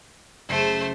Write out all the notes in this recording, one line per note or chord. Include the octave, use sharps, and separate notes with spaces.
F#1 A3 C5